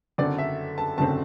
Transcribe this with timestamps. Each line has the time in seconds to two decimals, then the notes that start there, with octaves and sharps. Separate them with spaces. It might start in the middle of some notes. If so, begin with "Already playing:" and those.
0.18 F#1 F#2 D3 A3 C4 D5
0.38 E5
0.78 A5
0.98 F#1 F#2 D3 A3 C4 A5